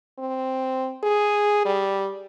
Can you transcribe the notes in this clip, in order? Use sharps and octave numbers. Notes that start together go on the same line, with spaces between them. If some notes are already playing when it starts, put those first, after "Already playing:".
C4
G#4
G3